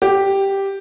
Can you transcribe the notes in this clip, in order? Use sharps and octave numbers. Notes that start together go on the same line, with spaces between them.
G4